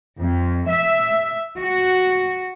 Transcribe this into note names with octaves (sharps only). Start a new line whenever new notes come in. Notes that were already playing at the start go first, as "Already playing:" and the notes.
F2
E5
F#4